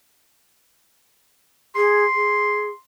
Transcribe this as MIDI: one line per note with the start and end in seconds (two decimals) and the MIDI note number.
1.76 2.04 68
1.76 2.76 84
2.15 2.68 68